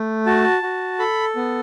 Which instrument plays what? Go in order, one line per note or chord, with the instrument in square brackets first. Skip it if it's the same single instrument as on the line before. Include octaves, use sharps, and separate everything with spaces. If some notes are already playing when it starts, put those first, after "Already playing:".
Already playing: [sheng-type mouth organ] A3
F#4 A5
F#4
A4 B5
B3